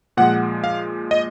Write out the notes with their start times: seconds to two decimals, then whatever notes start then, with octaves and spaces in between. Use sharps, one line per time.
0.17 A#2 F3 G#3 F#5
0.64 F5
1.11 D#5